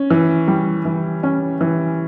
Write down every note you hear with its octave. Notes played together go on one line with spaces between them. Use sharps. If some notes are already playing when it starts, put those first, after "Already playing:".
Already playing: C#4
E3
G3
E3
C#4
E3